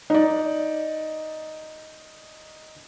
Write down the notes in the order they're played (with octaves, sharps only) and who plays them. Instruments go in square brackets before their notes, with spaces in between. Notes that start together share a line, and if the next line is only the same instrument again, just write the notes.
[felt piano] D#4 D5